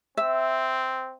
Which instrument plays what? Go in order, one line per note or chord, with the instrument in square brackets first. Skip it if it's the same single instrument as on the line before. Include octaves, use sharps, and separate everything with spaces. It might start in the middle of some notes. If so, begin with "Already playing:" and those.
[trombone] C4 [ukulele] E5